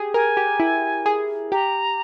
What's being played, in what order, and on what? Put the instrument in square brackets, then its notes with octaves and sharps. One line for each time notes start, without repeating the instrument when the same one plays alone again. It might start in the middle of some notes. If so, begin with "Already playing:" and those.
Already playing: [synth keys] G4 G#4
[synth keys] A#4 [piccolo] G#5
[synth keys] G4
E4
G#4
[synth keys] G4 [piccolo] A#5